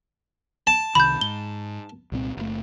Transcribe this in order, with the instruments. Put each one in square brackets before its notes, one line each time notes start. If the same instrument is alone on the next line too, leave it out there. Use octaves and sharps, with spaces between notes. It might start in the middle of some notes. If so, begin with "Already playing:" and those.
[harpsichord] A5
[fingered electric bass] C2 C3 D#3 [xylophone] B5 G6
[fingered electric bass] G#2 [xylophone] G7
[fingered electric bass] C2 A#2 C4
F#1 A3